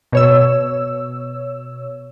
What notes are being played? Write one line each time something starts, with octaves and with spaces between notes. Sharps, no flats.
B2 C#5 E6